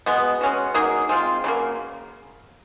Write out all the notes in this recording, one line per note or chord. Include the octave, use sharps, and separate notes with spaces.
B2 G#3 B3
G#3 C#4 F#4
F#3 A#3 D#4 G#4
G#3 C4 F4
C#3 F#3 A#3